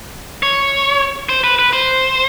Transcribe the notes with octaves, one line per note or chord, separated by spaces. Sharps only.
C#5
C5
B4
B4
C5